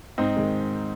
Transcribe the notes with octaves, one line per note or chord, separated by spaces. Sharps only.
G#2 C4 D#4
D#3 G#3